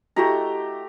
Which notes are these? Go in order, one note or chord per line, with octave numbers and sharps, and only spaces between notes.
A3 E4 F#4 G4 D#5 A#5